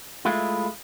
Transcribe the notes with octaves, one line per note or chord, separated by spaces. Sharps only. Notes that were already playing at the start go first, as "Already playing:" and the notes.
G#3 A3 E4 F4